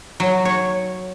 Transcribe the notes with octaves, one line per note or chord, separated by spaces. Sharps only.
F#3
C#5